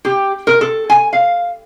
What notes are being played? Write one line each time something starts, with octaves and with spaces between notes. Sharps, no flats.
G4
A#4
A4
G#5
F5